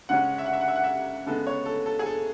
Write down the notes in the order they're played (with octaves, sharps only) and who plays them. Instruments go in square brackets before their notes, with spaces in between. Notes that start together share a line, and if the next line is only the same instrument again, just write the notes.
[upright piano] C#3 G#3 C#4 F#5
E5
F#5
E5
F#5
E5
F#5
E5
C#3 G#3 B3 A4
C#5
A4
A4
G#4
A4